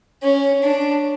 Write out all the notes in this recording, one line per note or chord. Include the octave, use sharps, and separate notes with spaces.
C#4
D4